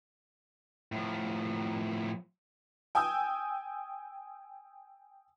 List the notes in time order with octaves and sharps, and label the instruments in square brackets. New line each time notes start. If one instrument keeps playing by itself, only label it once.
[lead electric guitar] A2 F3
[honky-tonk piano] G5 G#5 D#6 E6 G6